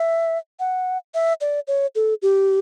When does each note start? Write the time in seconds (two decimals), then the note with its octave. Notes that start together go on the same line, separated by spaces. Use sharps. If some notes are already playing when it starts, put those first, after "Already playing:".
Already playing: E5
0.60 F#5
1.14 E5
1.41 D5
1.68 C#5
1.95 A4
2.22 G4